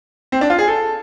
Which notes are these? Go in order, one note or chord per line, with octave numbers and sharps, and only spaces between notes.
C4
D4
F4
G#4
A4